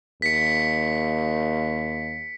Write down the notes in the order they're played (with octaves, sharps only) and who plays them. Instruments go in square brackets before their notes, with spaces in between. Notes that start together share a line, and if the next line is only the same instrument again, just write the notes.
[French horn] D#2 [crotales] B6 C#7